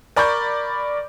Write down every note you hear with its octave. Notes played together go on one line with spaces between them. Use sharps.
A#4 D5 B5 C#6 G6